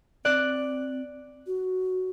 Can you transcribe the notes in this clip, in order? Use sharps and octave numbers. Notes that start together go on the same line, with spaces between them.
C4 D5 F#6
F#4